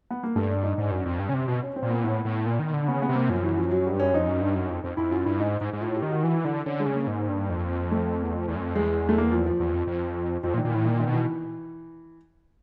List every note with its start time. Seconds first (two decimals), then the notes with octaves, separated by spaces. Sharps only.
0.10 B3
0.23 A#3
0.36 G2 A3
0.49 D4
0.63 D#4
0.78 G#2 D4
0.91 F#2
1.06 F2
1.20 G2
1.29 C#3
1.34 C3
1.48 B2
1.62 C#4
1.76 C4
1.83 A#2
1.90 B3
2.04 A2 B3
2.25 A2
2.46 A#2
2.59 D#3
2.74 D3
2.88 C#3 B3
3.02 B3
3.09 C3
3.15 A#3
3.29 F#2 F3
3.43 E3
3.57 F3
3.71 F#3
3.86 G3
3.92 G2
4.00 F#2 C#4
4.13 F2 D#4
4.28 F#2
4.42 G2
4.55 F#2
4.70 F2
4.84 F2
4.97 F2 E4
5.12 F#2 F4
5.25 G2 E4
5.40 G#2 D#4
5.61 G#2
5.73 G#2
5.81 A2 F4
5.96 G4
6.02 D#3
6.10 F#4
6.24 E3 F#4
6.34 E4
6.45 D3 E4
6.55 D4
6.65 D3 C#4
6.80 G#3
6.86 C#3
6.94 A#3
7.07 G#2
7.28 G2
7.50 F2
7.91 A3
8.23 E2
8.34 F2
8.48 E2
8.55 F#2
8.61 F2
8.75 E2 G#3
9.09 A3
9.18 A#3
9.31 F3
9.46 F3
9.60 E2
9.73 F2
9.87 F2
10.43 F2 F3
10.54 A#2
10.58 D#3
10.65 A#2
10.71 A2 E3
10.85 A#2 D#3
11.00 D#3
11.07 B2
11.13 E3